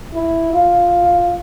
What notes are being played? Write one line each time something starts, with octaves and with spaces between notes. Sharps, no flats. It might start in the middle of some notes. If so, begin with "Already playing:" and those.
E4
F4